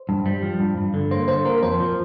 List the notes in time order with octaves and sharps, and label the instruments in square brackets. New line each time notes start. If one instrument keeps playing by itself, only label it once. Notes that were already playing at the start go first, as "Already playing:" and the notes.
Already playing: [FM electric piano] C5
[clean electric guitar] G2
G3
F3
G2
G2
D3
[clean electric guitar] A#3 [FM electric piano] C5
[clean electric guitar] D3 [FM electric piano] C5
[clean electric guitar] A#3 [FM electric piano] A#4
[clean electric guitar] F2 [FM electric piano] C5
[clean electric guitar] F3